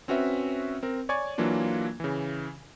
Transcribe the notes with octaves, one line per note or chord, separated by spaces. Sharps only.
C4 C#4 F#4 B4 E5
C4 A#4
C#5 D5 G#5 C#6 G#6
E3 F#3 A#3 D4 F4
C#3 E3